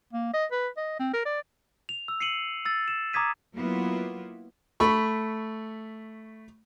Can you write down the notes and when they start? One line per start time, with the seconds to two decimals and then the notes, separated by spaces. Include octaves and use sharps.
0.13 A#3
0.34 D#5
0.52 B4
0.77 D#5
0.99 C4
1.14 A#4
1.25 D5
1.89 F7
2.08 E6
2.20 C7 C#7 D#7 F#7
2.65 E6 A6
2.88 E7
3.13 A#5 D6 D#6 G#6 B6 D#7
3.56 F#3 A#3 B3 E4 F4
4.80 A3 B5 C#6